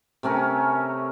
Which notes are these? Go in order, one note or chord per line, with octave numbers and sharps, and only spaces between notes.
C3 A3 C#4 A#4